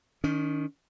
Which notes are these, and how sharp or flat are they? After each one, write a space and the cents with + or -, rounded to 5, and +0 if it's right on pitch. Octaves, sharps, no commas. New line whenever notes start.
D#3 +0 C#4 +40